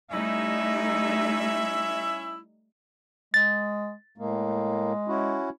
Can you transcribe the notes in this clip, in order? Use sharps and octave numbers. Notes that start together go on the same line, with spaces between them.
G3 A3 C#4 D#4 E4 E5
G#3 A6
A2 G#3 A#3
C#4 E4 F#4